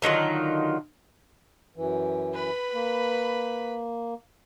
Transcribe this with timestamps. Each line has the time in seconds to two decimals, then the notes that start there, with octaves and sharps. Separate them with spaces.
0.02 D3 D#3 F#3 F4
1.76 F#2 E3
2.34 B4 B5
2.74 A#3